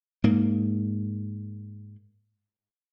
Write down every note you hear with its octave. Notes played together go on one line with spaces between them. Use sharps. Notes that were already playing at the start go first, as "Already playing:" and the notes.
G#2 A#3